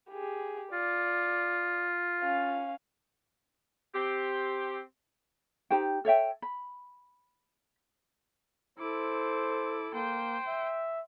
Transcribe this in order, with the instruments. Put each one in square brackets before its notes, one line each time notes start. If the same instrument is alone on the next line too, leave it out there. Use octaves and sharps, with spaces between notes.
[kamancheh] G4 G#4
[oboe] F4 [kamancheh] D5
[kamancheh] C#4 F5
[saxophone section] C4 G4
[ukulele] D#4 G4 C5 G5
A4 C#5 E5 G5
B5
[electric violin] E4 D6 [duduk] A4 [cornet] C5
[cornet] A#3 [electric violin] C5 G5
[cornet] E5